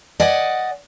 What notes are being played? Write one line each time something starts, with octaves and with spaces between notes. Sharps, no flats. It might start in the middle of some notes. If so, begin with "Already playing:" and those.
D5 D#5 F#5 G#5